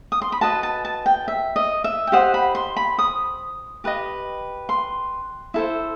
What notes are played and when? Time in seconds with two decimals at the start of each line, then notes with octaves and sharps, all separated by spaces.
0.12 D#6
0.22 C6
0.32 B5
0.41 F#4 B4 D#5 A5
0.63 A5
0.85 A5
1.06 G5
1.28 E5
1.56 D#5
1.84 E5
2.07 G5
2.12 G4 C5 D#5 F#5
2.34 B5
2.55 C6
2.77 B5
2.98 D#6
3.84 G4 B4 D#5
4.69 C6
5.54 E4 A4 C5